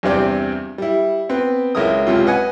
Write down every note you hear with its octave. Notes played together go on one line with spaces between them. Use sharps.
E2 G2 C3 C4 D5
G3 E4
B3 C4 B4
C#2 G#3 E4 A#4 D#6
C#2 C3 F4
B4 D#5 F#5 G#5